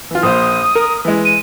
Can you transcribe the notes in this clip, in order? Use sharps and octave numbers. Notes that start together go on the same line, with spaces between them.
E3 F4
A#1 C5 F5 D#6
A#4
E3 G#3
D#7